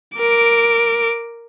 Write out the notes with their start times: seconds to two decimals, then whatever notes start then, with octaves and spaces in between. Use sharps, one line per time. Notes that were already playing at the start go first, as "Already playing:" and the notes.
0.18 A#4 D6